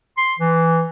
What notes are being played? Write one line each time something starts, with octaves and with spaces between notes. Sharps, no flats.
C6
E3